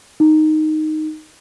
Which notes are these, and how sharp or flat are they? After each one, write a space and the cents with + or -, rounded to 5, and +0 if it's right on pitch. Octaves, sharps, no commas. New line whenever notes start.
D#4 -5